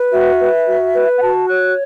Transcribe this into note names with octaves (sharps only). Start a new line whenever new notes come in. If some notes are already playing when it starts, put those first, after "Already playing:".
Already playing: B4
F#4 E5
B4
F#4
B4
F#5
F#4 A5
C#5 F#6